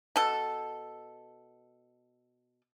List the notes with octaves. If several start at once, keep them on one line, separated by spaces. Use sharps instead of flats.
B2 A4